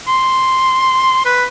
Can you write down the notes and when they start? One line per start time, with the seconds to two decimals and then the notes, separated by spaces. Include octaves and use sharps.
0.08 C6
1.26 B4